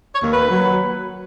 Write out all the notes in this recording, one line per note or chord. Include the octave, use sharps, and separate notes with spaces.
C#5
D#2
B4
F#3